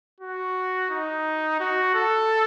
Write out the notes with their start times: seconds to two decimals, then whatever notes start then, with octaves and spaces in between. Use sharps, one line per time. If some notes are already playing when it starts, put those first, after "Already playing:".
0.20 F#4
0.90 D#4
1.60 F#4
1.95 A4